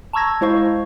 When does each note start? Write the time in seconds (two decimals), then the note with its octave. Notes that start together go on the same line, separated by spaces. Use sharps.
0.13 A5 A#5 C#6 E6 G#6 A#6
0.41 G#3 E4 C5 F5 C#6